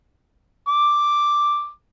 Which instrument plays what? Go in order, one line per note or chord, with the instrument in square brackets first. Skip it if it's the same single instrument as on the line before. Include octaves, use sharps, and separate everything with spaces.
[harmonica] D6